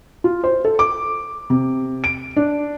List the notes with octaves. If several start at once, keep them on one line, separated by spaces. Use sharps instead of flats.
F4
C5
A4
D6
C3
D7
D4